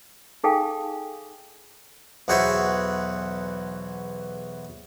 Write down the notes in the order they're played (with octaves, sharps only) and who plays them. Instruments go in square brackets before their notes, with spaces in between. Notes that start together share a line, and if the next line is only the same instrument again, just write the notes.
[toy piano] D#4 G#4 A4 F5 G5 G#5
[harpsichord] B1 E2 F#4 G#4 C5 E5